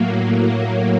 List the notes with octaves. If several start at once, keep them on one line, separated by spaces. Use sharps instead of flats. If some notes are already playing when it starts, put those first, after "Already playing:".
Already playing: A2 F#3 A#3